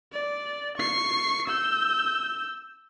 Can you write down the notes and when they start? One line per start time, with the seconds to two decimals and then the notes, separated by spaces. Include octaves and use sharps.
0.12 D5
0.77 C#6 C7
1.48 E6 G6